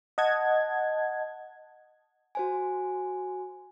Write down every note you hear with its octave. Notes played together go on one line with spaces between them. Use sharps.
D#5 F#5 A5 G#6
F#4 C5 G#5